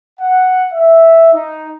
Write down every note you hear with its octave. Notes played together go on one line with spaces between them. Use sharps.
F#5
E5
D#4